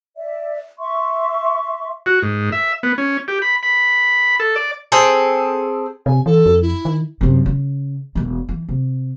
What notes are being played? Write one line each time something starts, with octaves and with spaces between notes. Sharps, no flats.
D5 E5
E5 C6 C#6
F#4
G#2
E5
B3
C#4
G4
B5
B5
A4
D5
C4 G#4 A4
C3 G#5
E3 A4
F2
E4
D#3
F#2 C3
C#3
E1 G#3
E3
C3